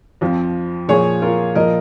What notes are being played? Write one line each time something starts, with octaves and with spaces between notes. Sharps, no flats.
F2 F3
A#2 F3 G#4 C#5
F4 A#4
A#2 F3 A#4 D#5